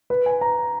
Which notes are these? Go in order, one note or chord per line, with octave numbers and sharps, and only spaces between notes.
B4
G#5
A#5